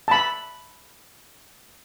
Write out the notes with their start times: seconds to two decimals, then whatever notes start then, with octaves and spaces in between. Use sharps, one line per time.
0.08 A5 B5